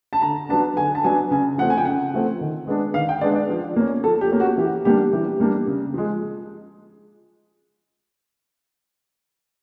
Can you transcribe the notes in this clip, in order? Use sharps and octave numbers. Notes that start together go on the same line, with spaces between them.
A5
D3 A#5
F#3 B3 D4 A5
D3 G#5
A5
F#3 B3 D4 G#5
C#3 G#5
F3 A3 C4 F#5
G#5
G5
C#3 F#5
F3 A3 C4
D#3
G#3 B3 D4
D#3 F5
G5
G#3 B3 D4 D5
D5
F3
A#3 C#4
F3 A4
G4
A#3 C#4
F#4
E3 G4
G3 A#3 D4 G4
E3 G4
G3 A#3 D4
C#3
F3 G#3